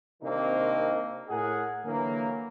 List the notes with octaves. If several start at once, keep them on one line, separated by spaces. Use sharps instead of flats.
C3 D#3 A#3 C4 D4 D#4
A2 G#4 A#4 F#5 G#5
D3 E3 F#3 A#3